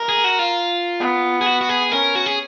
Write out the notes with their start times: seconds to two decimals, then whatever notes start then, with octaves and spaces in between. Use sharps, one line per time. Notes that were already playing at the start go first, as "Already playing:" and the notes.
Already playing: A#4
0.09 G#4
0.24 F#4
0.39 F4
1.00 B3
1.41 G#4
1.46 F#4
1.61 F#4
1.69 G#4
1.92 C#4 A#4
2.15 F#4
2.26 G#4